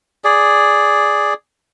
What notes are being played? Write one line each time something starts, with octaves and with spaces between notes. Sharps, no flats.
G#4 D5